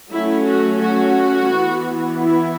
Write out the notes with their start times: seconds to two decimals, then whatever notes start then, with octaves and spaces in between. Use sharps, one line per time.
0.12 F#3 A3 C#4 E4
0.46 F#4
0.80 F#4
1.50 E3 B3
2.20 E4